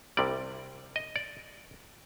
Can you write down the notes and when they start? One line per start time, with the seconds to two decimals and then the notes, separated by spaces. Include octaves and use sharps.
0.17 C2 C3 G3 D5
0.96 D#5
1.16 D5